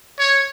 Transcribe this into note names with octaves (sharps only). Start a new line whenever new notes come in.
C#5